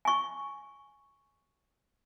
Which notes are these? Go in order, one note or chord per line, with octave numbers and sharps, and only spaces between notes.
G#5 C#6